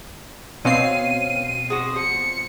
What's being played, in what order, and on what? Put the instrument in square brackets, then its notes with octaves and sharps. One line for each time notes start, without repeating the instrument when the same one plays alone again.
[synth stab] B2 C4 C7 [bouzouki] C#4 F5 [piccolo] D#7
[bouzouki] G#3 F#4 [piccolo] D#6
[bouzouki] F3 [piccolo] C#7